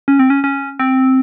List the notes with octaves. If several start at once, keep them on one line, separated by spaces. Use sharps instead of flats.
C#4
C4
C#4
C#4
C4